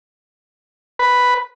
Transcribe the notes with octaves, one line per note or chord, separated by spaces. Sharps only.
B4